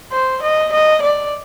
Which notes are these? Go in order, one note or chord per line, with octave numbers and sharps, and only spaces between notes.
C5
D#5
D#5
D5